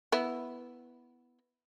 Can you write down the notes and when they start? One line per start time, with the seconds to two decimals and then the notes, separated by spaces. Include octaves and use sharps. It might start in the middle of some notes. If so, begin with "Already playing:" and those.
0.12 B3 E4